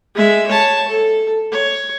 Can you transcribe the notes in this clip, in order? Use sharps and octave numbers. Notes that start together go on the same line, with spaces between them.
G#3 E5
C#5 A5
A4
C#5